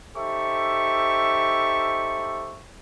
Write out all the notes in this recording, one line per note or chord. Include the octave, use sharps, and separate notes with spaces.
D#4 G4 A4 C5 E5 C#6